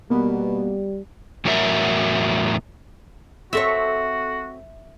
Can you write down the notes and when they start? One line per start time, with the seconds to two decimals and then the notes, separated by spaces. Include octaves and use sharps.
0.10 B2 G3 A#3 B3
1.45 E2 A2 F#3 F#4 A#4 E5
3.53 C4 F#4 A4 C#5 E5